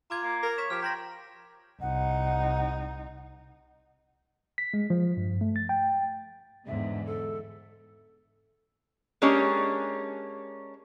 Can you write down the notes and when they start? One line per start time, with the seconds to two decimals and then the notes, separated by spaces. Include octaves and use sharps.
0.10 F4 A#5 D6 G#6
0.23 A#3
0.43 A#4
0.58 C#5 G#6 B6 E7
0.70 F3 G4 F6
0.83 G5 A#5 C6 A#6
1.81 C2 D#4 F#5
4.58 B6
4.74 G#3
4.90 F3
5.17 G2
5.41 A3
5.56 A6
5.69 G5
6.67 E2 G#2 D3 E5
7.05 A4
9.22 G#3 A#3 C#4 D4 G4 C#5